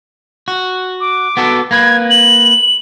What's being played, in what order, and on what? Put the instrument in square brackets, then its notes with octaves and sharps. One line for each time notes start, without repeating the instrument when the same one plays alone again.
[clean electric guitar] F#4
[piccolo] D6
[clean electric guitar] B3 F#4 A4
[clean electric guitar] A#3 B4 [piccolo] G#6
[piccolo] F#7